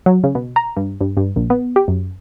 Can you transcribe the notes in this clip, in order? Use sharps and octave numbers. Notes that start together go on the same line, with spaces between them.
F#3
C#3
B2
A#5
G2
G2
G2
A#1
B3
G4
F#2